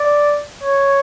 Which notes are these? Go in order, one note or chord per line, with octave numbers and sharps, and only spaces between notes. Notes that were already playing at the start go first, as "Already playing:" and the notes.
Already playing: D5
C#5